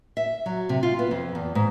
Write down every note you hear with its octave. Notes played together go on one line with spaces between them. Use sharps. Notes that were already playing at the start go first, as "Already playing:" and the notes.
E5
F#3
C3
F4
B3
F2
E2
G#2